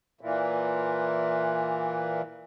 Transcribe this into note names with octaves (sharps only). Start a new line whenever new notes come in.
A#2 E3